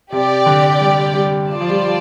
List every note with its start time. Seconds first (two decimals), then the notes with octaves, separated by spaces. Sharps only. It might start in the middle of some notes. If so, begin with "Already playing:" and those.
0.12 C3 G4 D5 G5
0.46 D3
0.80 G3
1.14 G3
1.48 F4 D5 A5
1.61 F3
1.70 G3